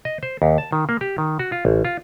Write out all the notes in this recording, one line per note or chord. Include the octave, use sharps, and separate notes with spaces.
D#5
C5
D#2
A5
D#3
A#3
G4
D#3
F#4
F4
A1
F4